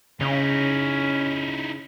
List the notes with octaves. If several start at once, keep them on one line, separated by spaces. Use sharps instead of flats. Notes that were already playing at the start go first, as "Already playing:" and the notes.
C#3 C#4 D#4 E4